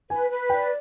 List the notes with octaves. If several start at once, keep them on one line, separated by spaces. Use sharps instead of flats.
B4 G#5
B4
D5 G5